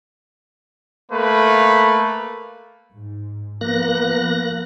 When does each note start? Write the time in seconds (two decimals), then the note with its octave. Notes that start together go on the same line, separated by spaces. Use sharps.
1.11 A3 A#3 B4
2.94 G#2
3.61 F3 A#3 B3 F#6 A#6